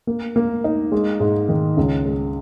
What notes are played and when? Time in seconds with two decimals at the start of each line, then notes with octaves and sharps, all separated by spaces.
0.07 A#3
0.36 A#3
0.64 D#4
0.92 G#3
1.20 G#2
1.49 D#3
1.77 C#2
2.05 G#3